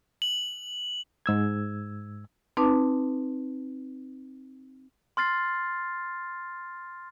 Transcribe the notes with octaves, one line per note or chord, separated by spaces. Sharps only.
F#7
G#2 E6 G#6
C4 D#4 B4 A5 D6
C6 F6 A6 C7